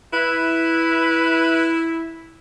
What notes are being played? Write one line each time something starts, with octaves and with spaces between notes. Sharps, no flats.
E4 B4